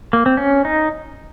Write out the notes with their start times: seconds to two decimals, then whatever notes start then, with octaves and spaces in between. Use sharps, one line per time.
0.13 A#3
0.26 C4
0.37 C#4
0.65 D#4